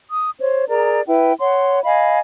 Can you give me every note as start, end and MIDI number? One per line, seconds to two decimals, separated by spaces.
0.10 0.31 87
0.40 0.66 72
0.40 0.66 73
0.69 1.01 68
0.69 1.01 70
0.69 1.01 74
0.69 1.01 82
1.07 1.33 64
1.07 1.33 71
1.07 1.33 79
1.40 1.80 73
1.40 1.80 78
1.40 1.80 84
1.84 2.19 75
1.84 2.19 77
1.84 2.19 80
1.84 2.19 83